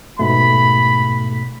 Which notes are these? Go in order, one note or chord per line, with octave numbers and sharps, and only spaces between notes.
G#2 B2 A3 B5